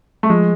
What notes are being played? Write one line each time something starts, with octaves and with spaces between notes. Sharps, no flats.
A3
F3 G#3